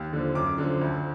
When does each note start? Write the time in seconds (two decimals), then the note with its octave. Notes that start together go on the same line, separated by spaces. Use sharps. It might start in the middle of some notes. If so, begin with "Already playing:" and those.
Already playing: D#2
0.13 D3 F3
0.35 F#2 D6
0.58 D3 F3
0.81 D2